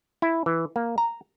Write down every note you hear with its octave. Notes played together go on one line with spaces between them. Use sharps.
E4
E3
A#3
A#5